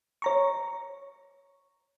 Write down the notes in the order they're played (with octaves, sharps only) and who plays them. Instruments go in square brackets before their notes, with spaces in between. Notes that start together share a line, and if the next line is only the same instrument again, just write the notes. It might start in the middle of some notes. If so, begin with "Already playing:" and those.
[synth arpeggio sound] C#5 A#5 C#6